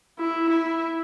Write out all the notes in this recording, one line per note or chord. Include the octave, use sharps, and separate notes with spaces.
E4
E4